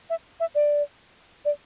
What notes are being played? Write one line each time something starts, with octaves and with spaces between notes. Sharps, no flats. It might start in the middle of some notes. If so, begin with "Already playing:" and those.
E5
E5
D5
D5